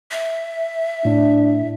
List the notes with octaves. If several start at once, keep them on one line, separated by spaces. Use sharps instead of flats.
E5
A2 D4